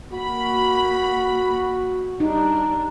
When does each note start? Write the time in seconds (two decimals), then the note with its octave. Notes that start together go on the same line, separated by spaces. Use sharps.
0.13 A#3 F#4 B5
2.20 G3 D4 D#4